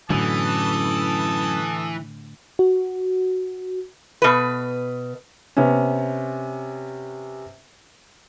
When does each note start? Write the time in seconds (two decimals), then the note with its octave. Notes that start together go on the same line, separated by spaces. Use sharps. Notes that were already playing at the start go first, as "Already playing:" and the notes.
0.10 F#2 A2 D3 E3 A4 A5 D#6
2.59 F#4
4.22 B2 B4
5.57 C3 B3 C#4